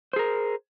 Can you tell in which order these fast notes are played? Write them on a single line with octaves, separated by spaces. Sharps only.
C5 G#4 A#4